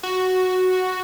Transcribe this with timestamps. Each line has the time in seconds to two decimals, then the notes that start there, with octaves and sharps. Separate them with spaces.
0.03 F#4